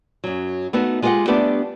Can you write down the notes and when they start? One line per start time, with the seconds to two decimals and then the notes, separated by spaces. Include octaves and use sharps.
0.24 F#2 F#3
0.73 A3 B3 D#4 F#4
1.02 G#3 F4 G4 B4 D#5 F#5
1.27 G3 A3 B3 D4 G4